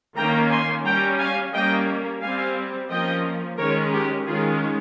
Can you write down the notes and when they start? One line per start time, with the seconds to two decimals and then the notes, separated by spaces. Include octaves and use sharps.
0.17 D#3 A#3 C#4 G5 A#5
0.51 G#5 C6
0.85 G3 C#4 G5 A#5
1.19 F5 G#5
1.54 G3 A#3 C#4 D#5 G5
2.22 G3 C4 F5 G#5
2.90 F3 A#3 C#4 D#5 G5
3.58 D#3 G#3 C#4 A#4 C#5
3.92 G4 A#4
4.26 D#3 G#3 C#4 F4 G#4